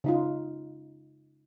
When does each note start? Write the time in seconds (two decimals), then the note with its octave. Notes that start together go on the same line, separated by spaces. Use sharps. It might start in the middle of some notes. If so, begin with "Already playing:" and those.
0.04 C#3 D#4 F4